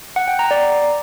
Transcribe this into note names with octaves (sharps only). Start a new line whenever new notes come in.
F#5
G5
A#5
D5